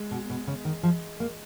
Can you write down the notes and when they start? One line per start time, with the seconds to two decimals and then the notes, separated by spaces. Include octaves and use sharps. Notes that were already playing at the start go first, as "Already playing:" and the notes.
Already playing: G#3
0.11 B2
0.30 B2
0.47 C#3
0.65 D#3
0.83 F3
1.20 A#3